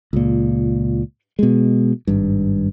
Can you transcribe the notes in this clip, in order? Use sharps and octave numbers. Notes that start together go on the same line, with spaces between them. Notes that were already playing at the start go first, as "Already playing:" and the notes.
C#2 A#2
B2 G#3
G#1 G2